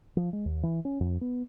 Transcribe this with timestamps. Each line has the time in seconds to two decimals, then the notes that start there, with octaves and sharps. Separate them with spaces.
0.17 F3
0.33 G#3
0.46 D#2
0.63 E3
0.85 C#4
1.00 F2
1.21 B3